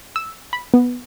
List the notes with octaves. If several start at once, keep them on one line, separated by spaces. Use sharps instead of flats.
E6
B5
B3